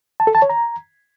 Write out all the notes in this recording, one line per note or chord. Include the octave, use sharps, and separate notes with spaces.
A5
A4
A5
C#5
A#5